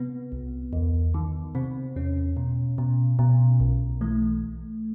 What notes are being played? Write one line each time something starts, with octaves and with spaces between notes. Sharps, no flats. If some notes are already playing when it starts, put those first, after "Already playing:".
Already playing: C3 B3
C2
E2
D#3
C3 C4
E2 C#4
B2
B2
B2
B1
E3 A3